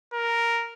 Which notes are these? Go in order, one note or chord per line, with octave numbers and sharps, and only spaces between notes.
A#4